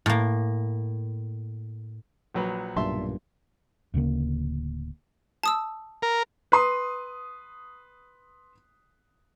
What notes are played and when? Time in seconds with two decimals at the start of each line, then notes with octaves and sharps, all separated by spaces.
0.06 A2 A#3
2.34 A#1 F#3 B4
2.76 B1 G2 A#2 E5 A5 C6
3.94 D1 D2 C#3 A#3
5.43 A5 D#6 E6
6.02 A#4
6.52 B4 C6 D#6